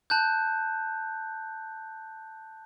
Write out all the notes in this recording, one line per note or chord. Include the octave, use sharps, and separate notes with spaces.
A5 F#6 G6